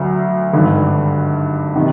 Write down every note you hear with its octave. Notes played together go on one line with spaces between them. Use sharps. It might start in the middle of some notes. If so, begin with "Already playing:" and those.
Already playing: D2 D3 F#3
G#1 G2 D3
C3 D#3